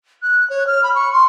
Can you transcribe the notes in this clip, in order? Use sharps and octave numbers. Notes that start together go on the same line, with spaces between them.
F#6
C#5
F6
B5
C#6
C6